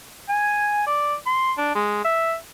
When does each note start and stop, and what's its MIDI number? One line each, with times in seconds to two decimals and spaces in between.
0.29 0.86 80
0.87 1.15 74
1.27 1.52 84
1.58 1.74 62
1.75 2.04 56
2.04 2.34 76